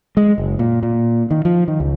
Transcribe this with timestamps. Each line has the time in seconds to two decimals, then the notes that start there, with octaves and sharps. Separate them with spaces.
0.17 G#3
0.38 F#1
0.59 A#2
0.83 A#2
1.31 D#3
1.45 F3
1.68 D#3
1.80 C#2